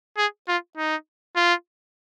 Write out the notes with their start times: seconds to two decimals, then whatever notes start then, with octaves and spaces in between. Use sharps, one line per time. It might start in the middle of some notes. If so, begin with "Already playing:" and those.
0.18 G#4
0.48 F4
0.78 D#4
1.36 F4